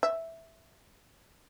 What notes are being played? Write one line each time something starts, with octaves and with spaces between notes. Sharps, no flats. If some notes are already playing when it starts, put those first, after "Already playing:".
E5